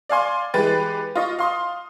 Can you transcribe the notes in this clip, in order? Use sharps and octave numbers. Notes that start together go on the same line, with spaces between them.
D5 F5 G#5 C6
E3 G#3 G4 B4 A6
F4 D#5 C#6
F5 C6 D#6